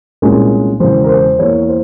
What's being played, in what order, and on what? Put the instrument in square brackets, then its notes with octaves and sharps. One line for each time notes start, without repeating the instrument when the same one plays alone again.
[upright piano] C2 A#2 G#3 C#4
E1 E2 C#3 C5
A#4
C5
E2 E3 A#3 C#5
C5